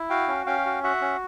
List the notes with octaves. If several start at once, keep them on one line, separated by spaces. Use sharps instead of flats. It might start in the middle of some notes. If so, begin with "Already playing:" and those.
Already playing: E4
F#4 F5 G5
C#4
C#4 F5 G5
F#4
F#4 E5 F#5
C#4